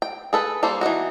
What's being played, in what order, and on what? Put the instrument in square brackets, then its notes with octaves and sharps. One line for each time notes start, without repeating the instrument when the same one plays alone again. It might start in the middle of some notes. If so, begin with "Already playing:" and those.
[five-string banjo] G5
G#4 A4 B4
G3 A#3 A4 C5
E3 B3 D#4 F#4